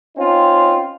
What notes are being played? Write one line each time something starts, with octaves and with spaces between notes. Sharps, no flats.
C4 C#4 D#4 F4